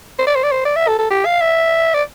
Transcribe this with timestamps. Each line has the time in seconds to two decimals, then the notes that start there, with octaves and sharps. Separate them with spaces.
0.19 C5
0.27 D5
0.35 C5
0.44 D5
0.51 C5
0.65 D5
0.76 E5
0.88 A4
0.99 A4
1.11 G4
1.26 F5
1.41 E5
1.94 D5